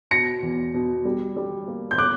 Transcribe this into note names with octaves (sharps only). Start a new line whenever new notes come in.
B2 A#6 C#7
E2
B2
G3
G3
A#3
G6
D6 F#6